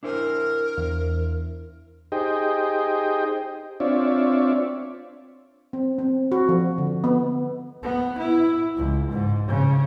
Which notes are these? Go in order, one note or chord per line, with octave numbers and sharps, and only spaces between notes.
D4 E4 A#4 C5
E2
D#4 G4 G#4 C5 D#5 G5
C4 D4 F4 C#5 D5 E5
C4
C4
F#4
F3
D3
B3
B3
E4
C#2
G#2
C#3